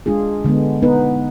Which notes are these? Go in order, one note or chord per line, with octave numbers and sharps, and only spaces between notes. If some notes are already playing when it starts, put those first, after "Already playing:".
G#3 D4 F4 G#4
D3 G#3 B3
B3 D#4 B4